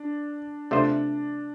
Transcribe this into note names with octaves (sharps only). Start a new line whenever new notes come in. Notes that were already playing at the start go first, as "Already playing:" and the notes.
Already playing: D4
C3 A3 D4 F4 C5